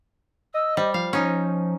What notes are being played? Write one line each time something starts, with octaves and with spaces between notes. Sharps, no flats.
D#5 E6
G3 C5
F3 F5
C#4 D#4